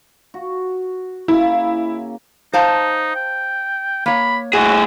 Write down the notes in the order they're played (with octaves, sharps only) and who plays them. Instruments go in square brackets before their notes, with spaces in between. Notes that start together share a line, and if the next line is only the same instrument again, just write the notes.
[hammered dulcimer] F#4
[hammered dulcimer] C#3 A#3 [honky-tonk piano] E4
[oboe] D#4 [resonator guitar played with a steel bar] C5 F5 A5
[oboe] G5
[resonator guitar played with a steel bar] A#3 C#5 [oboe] B5
[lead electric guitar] A2 G#4 [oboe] F#4